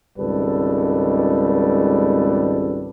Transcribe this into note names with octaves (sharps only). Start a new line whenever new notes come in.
G#1 C#2 G3 A4 B4